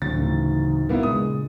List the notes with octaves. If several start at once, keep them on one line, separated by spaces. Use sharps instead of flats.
D1 D3 D4 A6
C#3 E3 A3 D#4
D#1 B1 G3 A#3 B3 E4
C#2 A#2 G#3 D4 D#6